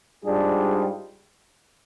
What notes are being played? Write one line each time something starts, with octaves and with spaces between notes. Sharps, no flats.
G#2 G3 D4 F4 G#4